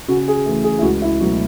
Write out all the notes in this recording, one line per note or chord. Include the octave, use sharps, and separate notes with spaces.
C#3 F#4
G#4
E3 A3
G#4
E4
C#2 F#4
E4
B2 F#3 A3 F#4